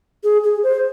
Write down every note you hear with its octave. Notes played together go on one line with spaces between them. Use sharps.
G#4
G#4
C5